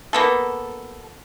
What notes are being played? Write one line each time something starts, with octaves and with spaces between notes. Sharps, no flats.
A#3 B3 A4